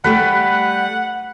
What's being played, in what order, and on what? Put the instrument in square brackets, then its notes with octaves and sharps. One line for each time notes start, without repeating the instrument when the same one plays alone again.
[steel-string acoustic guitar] G3 A3 G4 [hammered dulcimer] B4 [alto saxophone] F#5